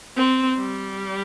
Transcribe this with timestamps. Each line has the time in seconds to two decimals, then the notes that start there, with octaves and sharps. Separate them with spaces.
0.17 C4
0.59 G3